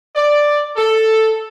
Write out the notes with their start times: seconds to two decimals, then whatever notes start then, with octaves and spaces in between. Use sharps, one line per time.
0.16 D5
0.77 A4